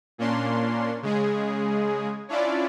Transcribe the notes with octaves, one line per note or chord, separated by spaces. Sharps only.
A#2 A#3 C#4 D4 C6
C#3 G#3 G#4
C#4 D4 E4 F4 D5